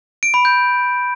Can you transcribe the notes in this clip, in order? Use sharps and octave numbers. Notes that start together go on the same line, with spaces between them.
D7
B5
G6